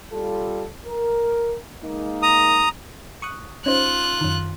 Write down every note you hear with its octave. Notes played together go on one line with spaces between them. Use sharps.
G3 F4 A4
A#4
G#3 A#3 D#4
A#5 D#6
C#6 D#6 F#6
C#4 D#4 F4 C5 F#6
F#2 D#3